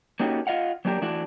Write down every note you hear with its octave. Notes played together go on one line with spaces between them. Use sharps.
A#3 C#4 D#4 F#4 G4 A4
F4 D#5 F5 F#5
F#3 A#3 D4 G4 A#4
E3 A3 D4 E4 F#4